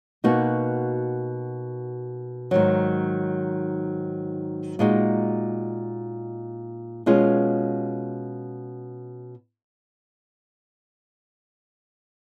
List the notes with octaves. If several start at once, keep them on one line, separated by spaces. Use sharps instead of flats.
B2 A#3 D#4 F#4
G#2 D#3 F#3
A#2 G#3 D#4 F#4
B2 G#3 C#4 F4